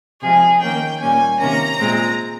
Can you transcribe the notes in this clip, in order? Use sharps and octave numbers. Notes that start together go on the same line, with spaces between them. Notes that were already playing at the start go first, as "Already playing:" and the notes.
C3 F3 G#3 G#4
D#3 A#3 C#4 G5
A#2 G3 A#3 C#4 G#5
C3 D#3 A#3 C#4 A#5
A#2 G#3 C4